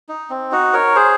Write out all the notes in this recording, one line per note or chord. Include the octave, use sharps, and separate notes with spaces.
D#4
C4
D#4 F#4
A#4 C#5
G#4 C5